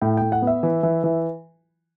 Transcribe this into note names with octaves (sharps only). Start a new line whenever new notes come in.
A2 G5
A2 G5
F#5
B3
E5
E3
E3
E3